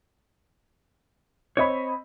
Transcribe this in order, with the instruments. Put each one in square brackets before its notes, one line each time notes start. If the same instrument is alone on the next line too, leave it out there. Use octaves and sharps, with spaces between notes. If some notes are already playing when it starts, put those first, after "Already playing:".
[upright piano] C4 D#5 B5 [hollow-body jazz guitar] C#5